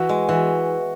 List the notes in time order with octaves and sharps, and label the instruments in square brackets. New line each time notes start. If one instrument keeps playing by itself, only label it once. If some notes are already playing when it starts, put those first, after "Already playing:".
Already playing: [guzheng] E3 [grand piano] F#4
[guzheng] G#3
[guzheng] E3 [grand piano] F#4